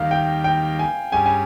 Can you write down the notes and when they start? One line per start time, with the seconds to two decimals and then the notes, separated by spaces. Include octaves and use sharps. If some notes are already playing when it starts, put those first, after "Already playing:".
Already playing: D#2 D#3 G3 A#3 F5
0.11 G5
0.44 G5
0.79 G#5
1.12 G2 G3 C#4 G#4 G#5
1.26 G#5